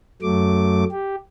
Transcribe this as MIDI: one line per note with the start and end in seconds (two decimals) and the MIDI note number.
0.22 0.84 42
0.22 0.84 54
0.22 0.84 57
0.22 0.84 86
0.92 1.16 67